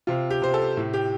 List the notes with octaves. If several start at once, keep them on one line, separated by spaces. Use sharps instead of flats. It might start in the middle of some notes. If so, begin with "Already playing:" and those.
C3 F4
G4
C3 C5
A4
A2
G4